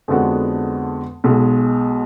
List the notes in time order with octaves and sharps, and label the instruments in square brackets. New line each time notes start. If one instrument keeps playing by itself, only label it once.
[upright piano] F2 D3 G#3 B3 F#4
B1 B2 G#3